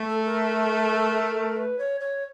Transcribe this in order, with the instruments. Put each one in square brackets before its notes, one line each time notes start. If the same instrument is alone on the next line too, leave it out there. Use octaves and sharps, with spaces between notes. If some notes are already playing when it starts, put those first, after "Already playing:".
Already playing: [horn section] A3
[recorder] A4
A#4
B4
C#5
C#5